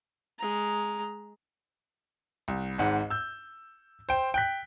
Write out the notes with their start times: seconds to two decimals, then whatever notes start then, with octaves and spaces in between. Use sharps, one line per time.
0.39 G#3 A#5
2.48 C2
2.78 G#1 G#2 F#5
3.10 E6 G6
4.09 C5 G5
4.34 G5 F#6 B6